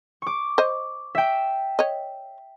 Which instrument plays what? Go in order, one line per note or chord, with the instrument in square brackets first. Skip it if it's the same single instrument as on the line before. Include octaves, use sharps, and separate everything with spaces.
[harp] C#6 D6
[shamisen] C5 D#5
[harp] E5 G5
[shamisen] C#5 D#5